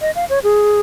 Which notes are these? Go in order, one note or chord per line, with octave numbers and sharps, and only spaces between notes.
D#5
F5
C#5
G#4